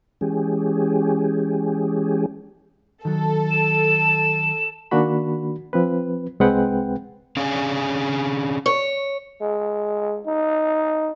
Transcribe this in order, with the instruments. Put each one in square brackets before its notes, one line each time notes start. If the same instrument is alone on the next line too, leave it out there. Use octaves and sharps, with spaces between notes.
[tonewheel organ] E3 G#3 C#4 G4 G#4
[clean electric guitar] D#3 F#3 [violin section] A4
[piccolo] E7
[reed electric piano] D#3 A#3 D4 F#4 B5
F3 C4 B4
C2 G#3 C4 B4 F#5 G5
[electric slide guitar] C#4 D4 G#4 F5
[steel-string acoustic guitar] C#5
[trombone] G#3
D#4